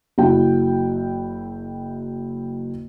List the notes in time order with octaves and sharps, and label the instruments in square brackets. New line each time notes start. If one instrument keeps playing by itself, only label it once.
[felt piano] F#1 E4 F#4 G5